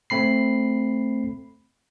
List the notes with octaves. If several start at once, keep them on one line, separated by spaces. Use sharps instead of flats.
A3 C4 B5 C7